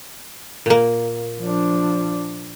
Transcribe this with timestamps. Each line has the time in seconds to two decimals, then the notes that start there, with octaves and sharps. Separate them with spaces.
0.66 A#2 A#3
1.40 F3 D4